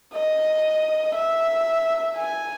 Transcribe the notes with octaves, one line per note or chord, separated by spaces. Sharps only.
D#5
E5
G#5